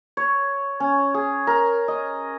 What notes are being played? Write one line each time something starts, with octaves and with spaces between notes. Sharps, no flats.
C#5
C#4
G#4
A#4
D#5